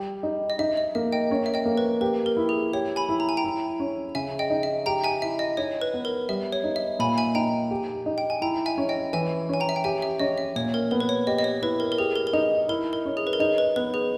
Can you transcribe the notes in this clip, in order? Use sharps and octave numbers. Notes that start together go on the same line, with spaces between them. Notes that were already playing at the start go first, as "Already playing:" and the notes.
Already playing: G3 G4
D#4
D#5
D#4 E5
D#5
A#3 E5
D#5 G5
C#4
E5
D#5 G5
A#3
B4
G4 B4
A#4
E4
G#4
G4 C#5
G#5 B5
E4
A#5
G#5
G5 A#5
E4
C#4
C#3 E5 G#5
D#5 G5
D#4
E5
G4 G5 A#5
E5 G#5
E4 E5
D#5
D#4 C#5
B4
B3
A#4
G3 E5
C#5
D#4
E5
A#2 G#5 B5
E5 G#5
D#4 G5 A#5
G4
D#4
G5
G#5
E4 G5 A#5
E5 G#5
C#4
D#5 G5
E3 E5 G#5
C#4 G#5
G5 A#5
E5
G5
G4 E5 G#5
E5
C#4 D#5
E5
A#2 C#5
A#4
B3 A#4
B4
C#5
G4 D#5
D#5
C#5
E4 B4
A#4
A#4
G4 G#4
A#4
A#4
D#4 G#4
E4 A#4
A#4
C#4
G#4
B4
A#4
D#4 G#4
B4
B3 B4
G#4